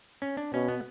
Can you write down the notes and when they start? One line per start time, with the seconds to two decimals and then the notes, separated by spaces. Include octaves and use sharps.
0.22 C#4
0.37 D4
0.53 B2 C#4
0.68 B3